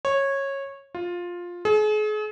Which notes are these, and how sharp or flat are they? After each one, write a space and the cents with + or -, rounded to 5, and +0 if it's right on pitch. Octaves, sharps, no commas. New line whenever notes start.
C#5 -15
F4 +10
G#4 +40